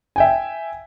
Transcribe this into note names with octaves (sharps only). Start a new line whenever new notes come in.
E5 G5 G#5